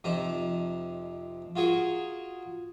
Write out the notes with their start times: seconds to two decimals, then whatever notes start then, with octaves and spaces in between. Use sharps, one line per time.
0.04 F2 C3 D#4 A#5
1.56 F4 F#4 G#4 A#4 C#6